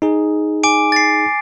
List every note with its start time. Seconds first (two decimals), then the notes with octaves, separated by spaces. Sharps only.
0.02 D#4 G#4
0.64 G#5 D6 D7
0.92 A6 C7